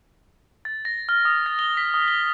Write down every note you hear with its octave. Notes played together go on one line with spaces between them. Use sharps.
A6
A#6
F6
D#6
A6
G7
B6
D#6
G7